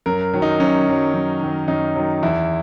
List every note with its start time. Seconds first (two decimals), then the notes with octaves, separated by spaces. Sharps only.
0.06 F#2 A#4
0.33 D#3 F#3
0.42 D#4
0.60 F#2 C#4
0.87 D#3 F#3
1.14 F#2
1.42 D#3 F#3
1.68 F#2 D#4
1.96 D#3 F#3
2.23 E2 E4